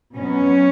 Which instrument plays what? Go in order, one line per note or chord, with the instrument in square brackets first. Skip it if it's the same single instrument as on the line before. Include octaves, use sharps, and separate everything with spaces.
[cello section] B2 F#3 B3 C#4